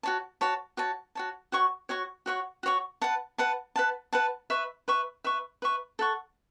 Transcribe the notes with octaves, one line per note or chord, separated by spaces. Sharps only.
F#4 C#5 A5
F#4 C#5 A5
F#4 C#5 A5
F#4 C#5 A5
F#4 C#5 F#5 C#6
F#4 C#5 F#5 C#6
F#4 C#5 F#5 C#6
F#4 C#5 F#5 C#6
B4 F#5 A5
B4 F#5 A5
B4 F#5 A5
B4 F#5 A5
B4 E5 C#6
B4 E5 C#6
B4 E5 C#6
B4 E5 C#6
A4 F#5 C#6